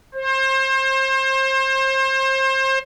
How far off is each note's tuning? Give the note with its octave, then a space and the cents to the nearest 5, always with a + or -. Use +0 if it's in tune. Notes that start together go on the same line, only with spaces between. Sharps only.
C5 +30